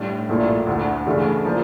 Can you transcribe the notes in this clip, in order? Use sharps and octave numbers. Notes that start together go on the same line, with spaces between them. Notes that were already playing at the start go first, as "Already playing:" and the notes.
Already playing: A2 G3 D4
A#1 A#2 A3 E4
D2 D3 A3
D2 C#3 E3 A3 D4
F3 A#3 D4